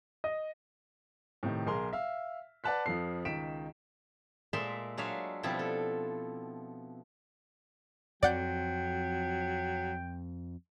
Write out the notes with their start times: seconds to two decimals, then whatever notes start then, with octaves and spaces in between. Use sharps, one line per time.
0.24 D#5
1.43 A2 C3 D#3
1.66 B1 G#4 A#4 C6
1.93 E5 F5
2.64 B4 D5 F#5 A5 F#6 B6
2.86 F2 F3 A4 C7
3.25 C#2 D#3 B6 D7 E7
4.53 A#2 G#3 A#4 E5 A5 C6
4.97 F#3 G#3 D4 C#5 E5 F5
5.43 B2 F3 G3 C4 E4 F4
5.59 A4
8.23 F2 F#3 C4 D5 F#5 G5 G6